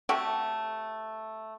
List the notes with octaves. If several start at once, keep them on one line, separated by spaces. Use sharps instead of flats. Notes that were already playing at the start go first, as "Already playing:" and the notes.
C3 A3 F#4 G4